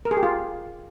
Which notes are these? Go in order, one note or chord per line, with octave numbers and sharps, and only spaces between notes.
A#4
G#4
G4
F4